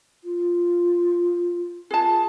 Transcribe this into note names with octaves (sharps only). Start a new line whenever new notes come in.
F4
F4 G#4 A5